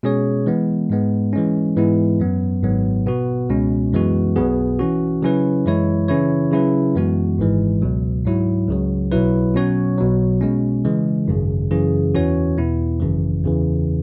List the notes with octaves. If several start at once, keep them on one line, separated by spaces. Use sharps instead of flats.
B2 G#3 C#4 G#4 C#5
E3 G#3 B3
G#2 G#3 B3
E3 G#3 C#4
G#2 E3 G#3 B3 E4
F#2 F#3 B3
G#1 G#2 F#3 B3
B2 B3 F#4
C#2 B2 G#3 C#4
F#2 E3 G#3 B3 F#4
B1 B2 B3 G#4
E3 C#4 F#4
C#3 F#3 C#4 E4 B4
F#2 E3 G#3 E4 C#5
C#3 E3 C#4 E4 C#5
C#3 F#3 C#4 E4 B4
F#2 E3 G#3 B3 F#4
G#1 G#2 E3 G#3
C#2 B2 F#3
G#2 F#3 E4
C#2 C#3 F#3
B1 B2 F#3 E4 B4
B2 F#3 C#4 F#4 C#5
B1 B2 F#3
B2 G#3 C#4
C#3 E3 G#3
G#1 F#2 C#3
F#2 C#3 E3 C#4 G#4
E2 E3 C#4 F#4 C#5
E2 B2 B3 E4
G#1 F#2 C#3 E3
E2 C#3 E3